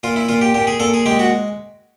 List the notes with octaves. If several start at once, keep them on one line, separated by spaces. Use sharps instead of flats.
A#2 F4
E4
A#2 F4
G4
A#2 G4
G#4
A#2 A4
G#4
G#3 G4
F#4